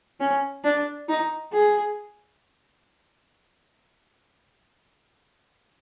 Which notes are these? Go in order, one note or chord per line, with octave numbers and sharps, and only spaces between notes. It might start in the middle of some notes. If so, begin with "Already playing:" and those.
C#4
D4
D#4
G#4